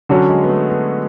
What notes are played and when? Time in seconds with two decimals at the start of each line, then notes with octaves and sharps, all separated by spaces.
0.09 D3 F#3 C#4 F#4
0.30 G#3
0.44 B3
0.49 A3
0.70 B3